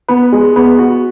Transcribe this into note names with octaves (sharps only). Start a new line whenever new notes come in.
B3
G#3
B3
F#4